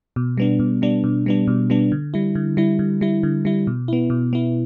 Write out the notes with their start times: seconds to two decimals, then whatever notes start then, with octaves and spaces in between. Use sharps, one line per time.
0.16 B2
0.37 G3 B3 D4
0.59 B2
0.82 G3 B3 D4
1.04 B2
1.26 G3 B3 D4
1.47 B2
1.70 G3 B3 D4
1.92 D3
2.14 G3 E4
2.35 D3
2.57 G3 E4
2.79 D3
3.01 G3 E4
3.23 D3
3.45 G3 E4
3.67 B2
3.88 B3 E4
4.10 B2
4.33 B3 E4